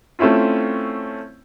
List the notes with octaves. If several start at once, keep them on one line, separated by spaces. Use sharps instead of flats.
A3 C4 C#4 E4 F4